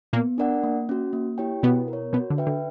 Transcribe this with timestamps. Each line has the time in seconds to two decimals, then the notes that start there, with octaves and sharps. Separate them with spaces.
0.13 A#2 A#3 B3
0.38 D4 A#4 D5 F#5
0.63 A#3
0.89 C#4 F#4
1.13 A#3
1.38 E4 G4 C#5 G5
1.63 B2 B3 E4
1.88 A#4
1.93 C#5
2.13 B2 B3 F#4
2.30 D3
2.38 B4 E5 G5
2.47 D3